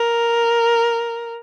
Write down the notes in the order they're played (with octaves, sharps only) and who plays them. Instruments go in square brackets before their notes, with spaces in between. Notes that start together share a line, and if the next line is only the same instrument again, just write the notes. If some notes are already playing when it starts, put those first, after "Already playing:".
Already playing: [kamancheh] A#4